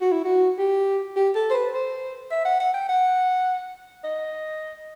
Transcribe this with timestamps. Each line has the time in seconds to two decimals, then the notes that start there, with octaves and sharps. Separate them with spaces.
0.01 F#4
0.12 E4
0.25 F#4
0.59 G4
1.16 G4
1.36 A4
1.51 C5
1.54 B4
1.74 C5
2.31 E5
2.45 F#5
2.60 F#5
2.74 G5
2.89 F#5
4.04 D#5